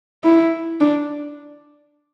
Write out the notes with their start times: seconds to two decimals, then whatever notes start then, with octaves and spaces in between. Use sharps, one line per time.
0.24 E4
0.81 D4